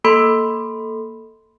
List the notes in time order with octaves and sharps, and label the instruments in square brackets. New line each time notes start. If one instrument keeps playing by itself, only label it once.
[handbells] A#3 A4 B5 C6